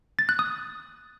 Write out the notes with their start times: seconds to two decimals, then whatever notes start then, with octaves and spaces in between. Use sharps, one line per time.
0.19 A6
0.29 F#6
0.39 D#6